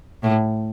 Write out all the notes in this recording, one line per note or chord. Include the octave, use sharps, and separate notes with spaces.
A2